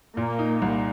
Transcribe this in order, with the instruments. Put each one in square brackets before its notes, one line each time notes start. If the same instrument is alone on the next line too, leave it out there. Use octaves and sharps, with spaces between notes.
[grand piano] A#2 [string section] A#3
[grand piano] D#4
C2